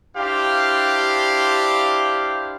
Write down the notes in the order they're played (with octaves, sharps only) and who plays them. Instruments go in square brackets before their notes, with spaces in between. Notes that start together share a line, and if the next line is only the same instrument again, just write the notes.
[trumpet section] D4 E4 G4 C5 F5